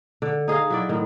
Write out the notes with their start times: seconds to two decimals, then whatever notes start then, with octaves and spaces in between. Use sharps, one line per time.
0.22 D3
0.48 D#4 G#4 D#5 F5
0.70 F#3 E4 D5
0.89 A2 D#3